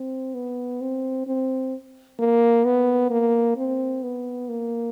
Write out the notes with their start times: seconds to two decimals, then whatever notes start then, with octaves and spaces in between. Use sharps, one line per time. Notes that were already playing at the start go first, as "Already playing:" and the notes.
Already playing: C4
0.34 B3
0.81 C4
1.27 C4
2.19 A#3
2.65 B3
3.10 A#3
3.57 C4
4.03 B3
4.49 A#3